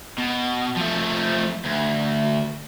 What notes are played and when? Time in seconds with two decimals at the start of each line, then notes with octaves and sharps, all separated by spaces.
0.18 B2
0.76 F3 A3
1.65 D2